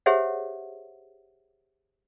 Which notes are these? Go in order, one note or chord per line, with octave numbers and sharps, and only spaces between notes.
G4 G#4 C5 C#5 E5 F#5